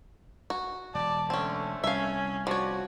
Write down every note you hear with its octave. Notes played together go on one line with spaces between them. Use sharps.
F#4
E1 D5 A5
D3 A3 C4 C#4
C2 C#4 E5 F5
F3 F#4 C#5 D5